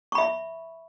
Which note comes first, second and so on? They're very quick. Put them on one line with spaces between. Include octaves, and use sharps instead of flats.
C#6 B5 E5